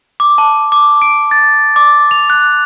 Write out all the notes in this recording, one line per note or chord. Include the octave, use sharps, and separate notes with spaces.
D6
A5
D6
D7
A6
D6
F7
F#6